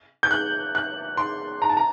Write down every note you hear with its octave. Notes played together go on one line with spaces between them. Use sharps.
G6
F#6
F#6
C6
A#5
A5
A#5